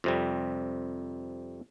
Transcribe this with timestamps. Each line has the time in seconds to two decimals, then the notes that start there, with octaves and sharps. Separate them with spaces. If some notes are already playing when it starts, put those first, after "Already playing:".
0.04 F2 C3 G3